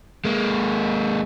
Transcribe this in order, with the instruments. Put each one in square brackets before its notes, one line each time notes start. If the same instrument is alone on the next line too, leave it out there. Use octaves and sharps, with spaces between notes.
[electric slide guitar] G#3 A#3